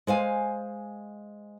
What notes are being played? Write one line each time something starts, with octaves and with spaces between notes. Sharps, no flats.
G#3 C5 F5 G#5